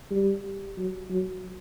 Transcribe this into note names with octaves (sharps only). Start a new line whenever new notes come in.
G3
F#3
F#3